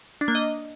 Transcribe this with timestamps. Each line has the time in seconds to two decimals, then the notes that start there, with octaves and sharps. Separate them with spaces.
0.21 D4
0.28 A#3
0.35 D#5